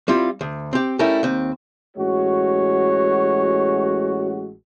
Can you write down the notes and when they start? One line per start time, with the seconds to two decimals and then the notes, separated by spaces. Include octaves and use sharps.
0.08 G3 C4 E4 F4
0.41 D2
0.73 C4 G4
0.99 G3 A3 C#4 E4 A#4
1.23 D#2 C4
1.97 A1 G#3 F#4 C#5